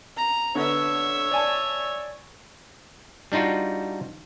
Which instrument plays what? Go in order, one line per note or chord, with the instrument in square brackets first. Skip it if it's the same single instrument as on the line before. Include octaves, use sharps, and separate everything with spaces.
[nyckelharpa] A#5
[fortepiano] D3 B3 [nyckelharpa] C#5 E5
[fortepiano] D5 G#5 A5
[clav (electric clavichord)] G3 D4 D#4 F4 F#4